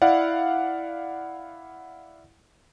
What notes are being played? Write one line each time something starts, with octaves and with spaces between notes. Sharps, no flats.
E4 D5 F5 F#5